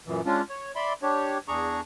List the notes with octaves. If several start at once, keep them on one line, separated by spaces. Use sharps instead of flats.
F#2 A#2 E3
G#3 C#4 D4 F4
C#5
D5 E5 B5 C6
D4 G4 C#5
E2 D4 G#4 A#5 C#6